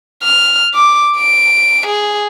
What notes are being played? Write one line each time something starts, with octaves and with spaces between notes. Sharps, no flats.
F6
D6
D7
G#4